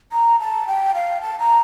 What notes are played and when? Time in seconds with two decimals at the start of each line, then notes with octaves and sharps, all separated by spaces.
0.12 A#5
0.40 A5
0.67 G5
0.94 F5
1.21 A5
1.39 A#5